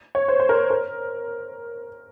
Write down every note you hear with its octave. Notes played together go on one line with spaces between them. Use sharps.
C#5
C5
C5
A#4
A#4